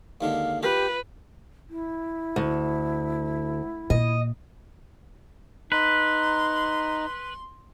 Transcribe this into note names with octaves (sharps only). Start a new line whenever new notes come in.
D#2 D3 G#3 F5
F4 G4 B4
E4
D2
A#2 D#5
D#4 B4 A#5 C6